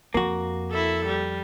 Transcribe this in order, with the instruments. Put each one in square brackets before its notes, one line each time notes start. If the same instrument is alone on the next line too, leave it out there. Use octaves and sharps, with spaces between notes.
[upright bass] F2 [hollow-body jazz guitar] A#3 F#4
[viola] E4 A4
G3